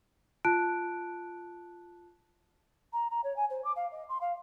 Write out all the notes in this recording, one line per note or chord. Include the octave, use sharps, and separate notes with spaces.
F4 A5 F#6 D7
A#5
A#5
C#5
G#5
C5
D6
F5
D#5
C6
F5